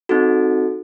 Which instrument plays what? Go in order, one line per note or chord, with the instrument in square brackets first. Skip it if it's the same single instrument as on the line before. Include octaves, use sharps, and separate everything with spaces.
[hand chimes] C4 D#4 F#4 A4